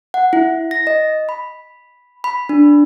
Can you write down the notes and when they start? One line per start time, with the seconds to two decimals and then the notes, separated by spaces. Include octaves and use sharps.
0.14 F#5
0.33 E4
0.71 A#6
0.87 D#5
1.29 B5
2.24 B5
2.49 D4